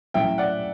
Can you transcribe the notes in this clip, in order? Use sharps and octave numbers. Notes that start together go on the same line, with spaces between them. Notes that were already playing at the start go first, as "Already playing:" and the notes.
A2 F#3 C#4 E5 G5
D5 F#5